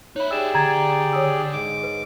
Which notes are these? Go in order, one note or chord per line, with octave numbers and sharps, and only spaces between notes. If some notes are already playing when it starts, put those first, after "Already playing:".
D#4 C#5 E5 B5 F#6
G4 G#4 D5 E6 E7
D3 A#5 G#6 A6
C#5 D#6 E6
G#2 D6
B4